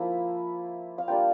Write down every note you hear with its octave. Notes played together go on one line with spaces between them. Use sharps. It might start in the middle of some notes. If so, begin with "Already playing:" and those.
Already playing: F3 A#3 E4
F5
G3 A#3 D4 F4 G5